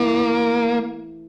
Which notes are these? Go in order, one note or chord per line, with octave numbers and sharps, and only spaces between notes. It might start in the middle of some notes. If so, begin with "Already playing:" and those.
Already playing: E3 A3 A#3 E4